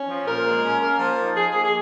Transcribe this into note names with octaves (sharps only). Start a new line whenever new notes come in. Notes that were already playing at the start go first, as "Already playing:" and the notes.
Already playing: C#4
F3
A#2 A#4
G#3
C#4
A#3
F3
D#4
F3 G#4
A#3 G#4
G#4